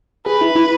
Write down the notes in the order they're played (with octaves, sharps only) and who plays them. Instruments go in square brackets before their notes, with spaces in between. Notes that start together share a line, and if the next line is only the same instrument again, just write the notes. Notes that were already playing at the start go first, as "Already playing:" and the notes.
[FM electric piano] G#4 [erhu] B4
[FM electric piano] E4
E4